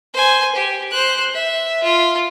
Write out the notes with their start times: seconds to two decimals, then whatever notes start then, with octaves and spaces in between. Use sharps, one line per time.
0.14 C5 G#5
0.55 G4
0.91 C5 F#6
1.34 E5
1.84 F4